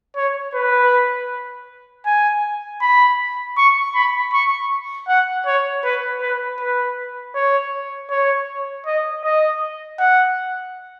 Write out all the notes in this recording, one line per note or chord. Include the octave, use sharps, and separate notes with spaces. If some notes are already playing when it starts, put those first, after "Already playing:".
C#5
B4
G#5
B5
C#6
B5
C#6
F#5
C#5
B4
B4
B4
C#5
C#5
D#5
D#5
F#5